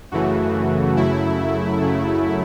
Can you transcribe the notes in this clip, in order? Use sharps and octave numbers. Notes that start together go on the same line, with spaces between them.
F#2 C#3 E3 A3 F#4
F#2 C#3 F#3 A3 E4
F#2 C#3 F#3 A3